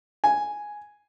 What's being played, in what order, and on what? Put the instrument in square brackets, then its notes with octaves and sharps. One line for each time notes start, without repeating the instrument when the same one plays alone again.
[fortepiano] G#5